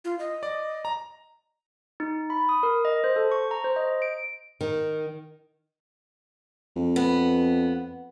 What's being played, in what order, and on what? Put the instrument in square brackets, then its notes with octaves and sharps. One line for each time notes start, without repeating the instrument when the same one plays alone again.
[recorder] F4
D#5
[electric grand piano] D5
A#5
[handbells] D#4
B5
D#6
A#4
D#5
C5
A4
C#6
A#5
C5
D#5
D7
[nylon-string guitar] D#3
[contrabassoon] F2
[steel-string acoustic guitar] B3